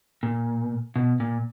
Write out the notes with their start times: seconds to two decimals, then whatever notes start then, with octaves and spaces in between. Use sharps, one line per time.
0.23 A#2
0.96 B2
1.20 A#2